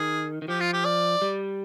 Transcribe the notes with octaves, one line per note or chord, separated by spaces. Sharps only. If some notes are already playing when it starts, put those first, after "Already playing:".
Already playing: D#3 G#4
D#3
F3 G4
F4
G4
D5
G3